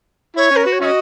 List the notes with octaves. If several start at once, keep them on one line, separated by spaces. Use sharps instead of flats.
E4 C#5
C#4
A#4
F#4 B4
C#5
C#4 F#4 D#5 E5